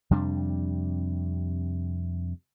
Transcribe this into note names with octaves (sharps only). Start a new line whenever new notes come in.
F2 C3 G3 D4